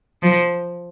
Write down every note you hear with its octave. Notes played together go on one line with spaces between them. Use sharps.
F3